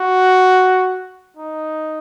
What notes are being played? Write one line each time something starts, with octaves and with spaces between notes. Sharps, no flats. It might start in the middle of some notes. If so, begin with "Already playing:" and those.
Already playing: F#4
D#4